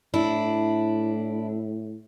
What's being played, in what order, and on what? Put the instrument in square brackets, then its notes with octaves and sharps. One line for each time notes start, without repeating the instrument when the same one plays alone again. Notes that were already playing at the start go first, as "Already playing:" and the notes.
[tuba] A2 [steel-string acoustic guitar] D4 E4